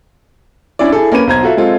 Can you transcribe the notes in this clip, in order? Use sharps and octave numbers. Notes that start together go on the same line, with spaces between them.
C#4 D4 E4 D5
E4 G#4 A4
A#3 C#4 B4 D#7
B1 C5 A#5 G#6
F4 F#4 A4 E5
G#3 C4 F4 A4